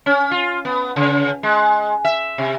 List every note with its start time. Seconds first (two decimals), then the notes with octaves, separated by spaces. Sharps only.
0.06 C#4
0.31 F4
0.65 B3
0.96 C#3
1.43 G#3
2.05 E5
2.38 C3